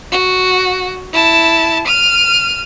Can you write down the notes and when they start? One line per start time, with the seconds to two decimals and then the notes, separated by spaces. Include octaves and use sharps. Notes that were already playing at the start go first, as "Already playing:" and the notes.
0.12 F#4
1.13 E4 A5
1.87 F6 D#7